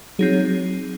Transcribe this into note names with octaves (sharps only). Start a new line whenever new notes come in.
F#3 C4 D#4 G#4